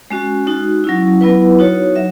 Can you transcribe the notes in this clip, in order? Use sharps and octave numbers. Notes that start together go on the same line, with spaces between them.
G#3 C#4 F#4
G#3 D#4 F#4
F#3 C#4 E4
F#3 B3 E4 B4
D#4 F#4 C#5
F#3 E5